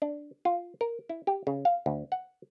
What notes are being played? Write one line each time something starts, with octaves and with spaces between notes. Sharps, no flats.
D4
F4
A#4
E4
G4
C#3
F5
D2
F#5